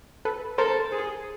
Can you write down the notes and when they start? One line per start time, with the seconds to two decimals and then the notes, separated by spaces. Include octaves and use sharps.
0.25 A4 B4
0.58 A4 A#4 C5
0.92 G#4